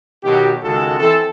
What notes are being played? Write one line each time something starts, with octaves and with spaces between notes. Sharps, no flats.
B2 D#3 F#3 G4
C#2 D#3 G#3 F#4 A4
E3 C4 A4